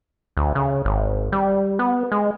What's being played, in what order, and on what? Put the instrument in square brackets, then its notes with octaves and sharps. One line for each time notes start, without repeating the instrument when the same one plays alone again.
[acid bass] D2
C#3
G#1
G3
B3
G#3